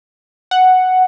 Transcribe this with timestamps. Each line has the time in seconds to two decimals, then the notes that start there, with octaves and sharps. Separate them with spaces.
0.51 F#5